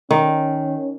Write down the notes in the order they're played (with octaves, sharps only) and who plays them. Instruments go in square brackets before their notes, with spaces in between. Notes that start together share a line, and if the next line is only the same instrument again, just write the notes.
[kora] D#3 [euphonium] C#4